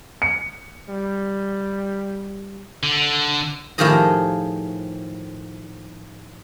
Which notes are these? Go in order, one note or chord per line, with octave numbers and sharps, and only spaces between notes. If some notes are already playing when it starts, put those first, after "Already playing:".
C#7
G3
D3
A2 D#3 F3 G4 G#4 D#5